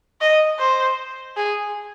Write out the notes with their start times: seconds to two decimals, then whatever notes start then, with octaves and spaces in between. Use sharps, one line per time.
0.21 D#5
0.59 C5
1.37 G#4